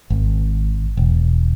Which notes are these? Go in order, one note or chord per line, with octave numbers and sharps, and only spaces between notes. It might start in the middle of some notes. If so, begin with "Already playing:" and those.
G#1
E1